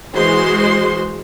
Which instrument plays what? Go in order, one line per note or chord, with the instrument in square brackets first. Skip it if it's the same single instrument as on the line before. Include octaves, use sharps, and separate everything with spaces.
[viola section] E3 G#3 F#4 C5 C6